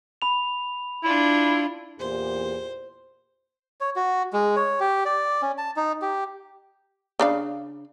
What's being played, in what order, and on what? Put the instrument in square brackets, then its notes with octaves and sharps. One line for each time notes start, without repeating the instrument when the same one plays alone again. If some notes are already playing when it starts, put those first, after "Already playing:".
[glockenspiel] B5 F7
[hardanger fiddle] D4 F4 [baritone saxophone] E4
[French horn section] E2 A#2 G4 [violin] C5
[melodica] C#5
F#4
G#3
C#5
G4
D5
C#4
A5
D#4
G4
[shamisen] C#3 D4 F5